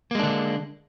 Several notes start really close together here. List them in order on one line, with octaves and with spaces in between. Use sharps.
A#3 G#3 D4 D3